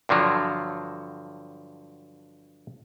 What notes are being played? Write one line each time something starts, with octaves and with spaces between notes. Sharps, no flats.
G2 D3 F3 F#3